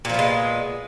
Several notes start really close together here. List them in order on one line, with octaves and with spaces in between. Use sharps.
A#2 F3 B3 G#3